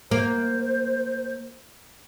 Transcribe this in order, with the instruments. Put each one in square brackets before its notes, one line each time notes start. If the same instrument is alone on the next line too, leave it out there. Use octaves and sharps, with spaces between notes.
[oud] A#3 [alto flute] C5